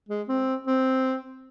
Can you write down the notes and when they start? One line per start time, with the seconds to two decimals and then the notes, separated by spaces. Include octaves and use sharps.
0.09 G#3
0.28 C4
0.67 C4